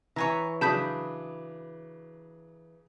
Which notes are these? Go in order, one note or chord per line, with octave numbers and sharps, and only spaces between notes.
E3 C#5 G#5 A#5
C#3 F#3 D4 A5 B5 D#6 G6 B6